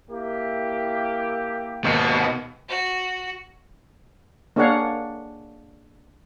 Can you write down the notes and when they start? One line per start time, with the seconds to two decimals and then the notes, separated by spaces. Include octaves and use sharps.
0.11 A#3 E4 G4
1.84 G#1 D#2 B2
2.69 F#4
4.56 A#3 D4 G#4 C#5 F5 F#5